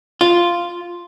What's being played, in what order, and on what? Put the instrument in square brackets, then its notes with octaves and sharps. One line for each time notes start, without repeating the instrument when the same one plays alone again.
[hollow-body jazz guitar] F4